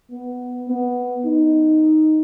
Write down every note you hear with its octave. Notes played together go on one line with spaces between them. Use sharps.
B3
B3
D#4